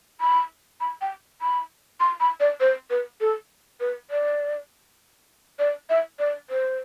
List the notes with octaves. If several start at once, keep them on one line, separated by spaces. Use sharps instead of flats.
B5
B5
G5
B5
C6
B5
D5
C5
B4
A4
B4
D5
D5
E5
D5
C5